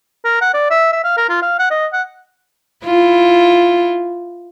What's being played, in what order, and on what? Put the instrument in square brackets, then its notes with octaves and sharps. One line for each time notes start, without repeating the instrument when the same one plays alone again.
[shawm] A#4
F#5
D5
E5
E5
F5
A#4
F4
F5
F#5
D#5
F#5
[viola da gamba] E4 F4